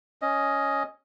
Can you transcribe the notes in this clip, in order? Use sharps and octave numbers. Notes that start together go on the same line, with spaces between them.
C#4 D#5